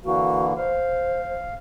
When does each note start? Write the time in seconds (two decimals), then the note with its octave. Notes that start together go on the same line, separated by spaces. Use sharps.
0.04 D3 E3 A#3 F#4
0.57 C5 F5